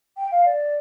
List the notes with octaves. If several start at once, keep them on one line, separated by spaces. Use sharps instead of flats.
G5
F5
D5